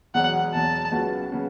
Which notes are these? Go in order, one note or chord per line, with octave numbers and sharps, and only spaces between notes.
E1 E2 B2 F#3 F#5
E1 E2 B2 F#3 A5
C#2 C#3 F#3 B3 F#4
C#3 F#3 B3